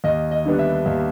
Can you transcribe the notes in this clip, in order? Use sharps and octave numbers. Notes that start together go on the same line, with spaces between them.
D#2 D#5
D#5
D3 G3 B3 D4
E5
D#2